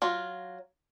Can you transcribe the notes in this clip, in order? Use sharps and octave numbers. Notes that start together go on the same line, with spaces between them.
F#3 F4